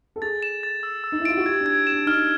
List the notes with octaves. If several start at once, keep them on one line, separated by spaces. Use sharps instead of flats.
A4
G#4 A6
E7
A6
E6
E6
D#4
E4
F4 D7
F#4
G4 G#6
D4
G#6
E7
D4
D#4 F6